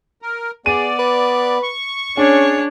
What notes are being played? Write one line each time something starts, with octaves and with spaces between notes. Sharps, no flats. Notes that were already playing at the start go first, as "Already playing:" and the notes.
A#4
B3 G#4 D5 D#7
B4
C#6
C#4 D4 G#4 C#5